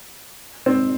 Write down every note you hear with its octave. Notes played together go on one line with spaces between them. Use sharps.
C4